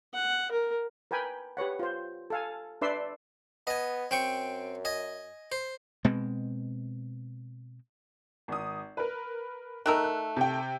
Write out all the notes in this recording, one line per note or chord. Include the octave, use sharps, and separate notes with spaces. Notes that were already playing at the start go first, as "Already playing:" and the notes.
F#5
A#4
A#4 B4 G5 G#5 B5
G4 B4 C#5 F#5
F4 C5
A4 F5 G#5
D4 B4 D5 E5 C6 E6
B3 D#5 G#5
F#2 C4 G5 C#6
D#5 G#5
C5
B2 G#3 C4
G#1 D#6
A#4 B4
D#3 A3 A#4 E6 F#6
F#6
C3 G5